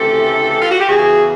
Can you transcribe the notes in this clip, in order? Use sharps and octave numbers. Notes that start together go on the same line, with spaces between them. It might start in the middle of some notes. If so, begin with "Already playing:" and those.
Already playing: D2 C#3 E3 A3 C4 G4 A4
F4
F#4
G4
E2 C#3 E3 F#4 G#4